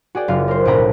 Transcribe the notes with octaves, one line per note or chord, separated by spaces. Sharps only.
F#4 G#4 D5 G5
F#1 F4 F5
A#4 C5
B1 A2 D4 G5 A#5 B5